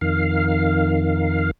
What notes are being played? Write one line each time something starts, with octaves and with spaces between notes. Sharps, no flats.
F2 D#3 F5